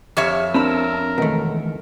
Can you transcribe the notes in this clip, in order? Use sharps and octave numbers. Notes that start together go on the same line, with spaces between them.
F2 G4 C#5 E5 F6
C4 D4 A#4 A5 B5 E6
B2 D#3 E3 G#3 A3